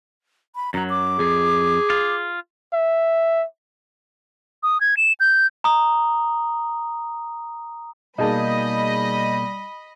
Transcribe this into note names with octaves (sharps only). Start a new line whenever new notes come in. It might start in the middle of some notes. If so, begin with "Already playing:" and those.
B5
F#2 F#3 A#5
D6
F2 G#4
F4
E5
D#6
G#6
E7
G6
A#5 D#6
B2 G3 A#3 D#4 G#4 D#5 A5 B5